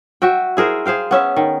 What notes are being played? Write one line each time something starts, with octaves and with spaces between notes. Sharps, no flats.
F#4 E5 G5
E4 G#4 A#4 C5
G#4 C5 F5 G5
B3 C#4 E5
D#3